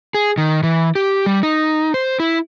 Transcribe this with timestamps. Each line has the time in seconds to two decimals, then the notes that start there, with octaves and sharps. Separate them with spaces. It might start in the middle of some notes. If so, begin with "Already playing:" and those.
0.14 G#4
0.38 D#3
0.63 E3
0.95 G4
1.26 G3
1.43 D#4
1.94 C5
2.20 E4